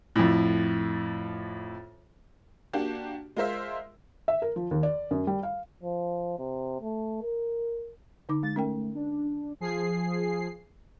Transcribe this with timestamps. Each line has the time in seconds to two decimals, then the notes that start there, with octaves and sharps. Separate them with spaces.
0.16 F2 A2
2.73 A#3 D4 F#4 G4
3.36 G#3 F4 A#4 C5 E5
4.28 E5
4.42 A#4
4.56 F3
4.71 D#2
4.83 D5
5.11 F#2
5.27 G3
5.43 F5
5.83 F3
6.39 C3
6.81 A3
7.22 A#4
8.29 D3 D#4 D6
8.43 G#3 A6
8.56 A3 C#4 A#4 G5
8.95 D4
9.60 F3 G#4 C7